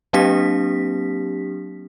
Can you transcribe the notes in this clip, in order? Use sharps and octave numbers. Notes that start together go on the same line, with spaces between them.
F#3 A#3 C4 D4 G4 B6